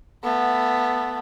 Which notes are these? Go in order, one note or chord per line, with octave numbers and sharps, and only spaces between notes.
A3 B3